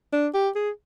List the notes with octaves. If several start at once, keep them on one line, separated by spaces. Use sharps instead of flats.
D4
G4
G#4